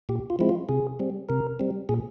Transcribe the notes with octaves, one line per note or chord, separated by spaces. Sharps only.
A#2 G4
F4
F3 G#3 C4 E4
F4
C3 G#4
G3 C4
C3 A#4
G3 C4
A#2 G#4